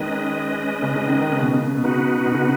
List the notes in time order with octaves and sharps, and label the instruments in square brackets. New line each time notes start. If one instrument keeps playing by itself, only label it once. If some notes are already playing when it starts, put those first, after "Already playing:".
Already playing: [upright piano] D#3 [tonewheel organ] G#3 C#4 B4 D#5
[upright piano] C#3
C#3
D#3
D#3
C#3
B2
C#3
B2
[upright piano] C#3 [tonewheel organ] B3 D#4 F#4 B4
[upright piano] B2
C#3